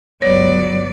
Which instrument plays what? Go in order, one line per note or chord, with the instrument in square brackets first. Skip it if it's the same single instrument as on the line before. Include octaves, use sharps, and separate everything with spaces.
[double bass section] G1 C#2 B3 [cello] F#3 D5 [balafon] C#5